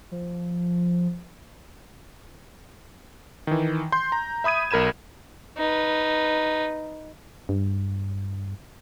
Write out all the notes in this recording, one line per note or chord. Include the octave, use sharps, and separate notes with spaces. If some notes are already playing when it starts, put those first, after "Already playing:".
F3
D#3 E3
C6 G6
A#5
E5 B5 D#6 G#6 D#7
B1 A#4 B5 G#6 E7
D#4 B4
G2